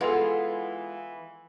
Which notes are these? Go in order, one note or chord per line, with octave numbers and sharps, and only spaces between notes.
E3 G#3 B3 F4 A4 F#5